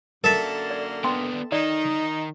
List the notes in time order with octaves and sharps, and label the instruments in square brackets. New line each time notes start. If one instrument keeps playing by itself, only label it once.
[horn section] F#2 D3 A#3 [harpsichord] A4 E5 A5 [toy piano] A#4
[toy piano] D5
[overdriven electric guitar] B3 D4 [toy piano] G5 C6
[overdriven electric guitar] D#3 [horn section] D#4 [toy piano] D5